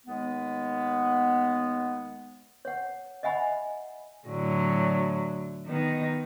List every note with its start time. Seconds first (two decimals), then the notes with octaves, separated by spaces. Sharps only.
0.07 D#2 G#3 B3
2.65 C#5 F#5
3.23 D#5 E5 F#5 G#5 B5
4.28 A2 D3 F#3
5.66 D#3 B3 D#4